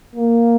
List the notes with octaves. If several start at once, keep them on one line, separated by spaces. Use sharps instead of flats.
A#3